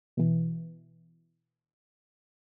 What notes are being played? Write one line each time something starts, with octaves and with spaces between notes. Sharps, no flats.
B2 E3